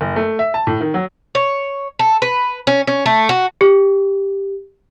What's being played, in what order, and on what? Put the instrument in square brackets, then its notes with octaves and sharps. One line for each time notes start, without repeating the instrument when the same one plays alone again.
[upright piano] F#1
A3
E5
A5
A2
D#3
F#3
[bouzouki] C#5
A4
B4
C#4
C#4
A3
F#4
[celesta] G4